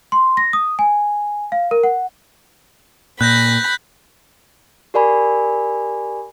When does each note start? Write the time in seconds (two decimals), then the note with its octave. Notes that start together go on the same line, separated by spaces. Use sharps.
0.12 C6
0.37 A#6
0.53 D#6
0.79 G#5
1.52 F5
1.71 A#4
1.83 F#5
3.21 A#2 B5 F#6 G6 A#6
4.94 G4 A#4 D5 G#5 B5